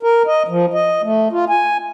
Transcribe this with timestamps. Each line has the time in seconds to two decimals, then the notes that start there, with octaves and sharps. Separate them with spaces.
0.03 A#4
0.27 D#5
0.48 F3
0.74 D#5
1.03 A3
1.32 F4
1.49 G#5